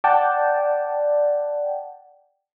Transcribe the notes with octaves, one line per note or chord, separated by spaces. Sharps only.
D5 F#5 G5 A5